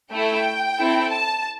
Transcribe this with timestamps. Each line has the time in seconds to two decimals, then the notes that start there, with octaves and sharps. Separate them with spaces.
0.12 A3 E4 A4 G5
0.78 C4 E4 A4
1.11 A5